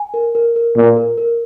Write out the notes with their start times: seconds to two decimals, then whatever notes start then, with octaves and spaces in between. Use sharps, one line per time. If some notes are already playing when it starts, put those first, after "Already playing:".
Already playing: G#5
0.14 A#4
0.35 A#4
0.56 A#4
0.76 A#2 A#4
0.96 A#4
1.18 A#4